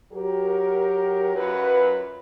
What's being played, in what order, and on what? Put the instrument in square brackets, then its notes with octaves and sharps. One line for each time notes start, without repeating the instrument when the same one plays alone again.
[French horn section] F#3 G4 A#4
F#2 F#3 F4 B4